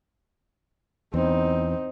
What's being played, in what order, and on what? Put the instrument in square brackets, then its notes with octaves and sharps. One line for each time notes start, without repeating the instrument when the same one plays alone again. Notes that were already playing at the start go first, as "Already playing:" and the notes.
[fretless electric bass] E2 [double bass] C4 D#4